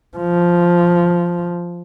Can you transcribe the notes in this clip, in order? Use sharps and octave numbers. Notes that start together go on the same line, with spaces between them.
F3